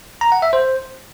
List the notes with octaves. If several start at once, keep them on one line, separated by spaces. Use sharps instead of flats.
A#5
F#5
E5
C5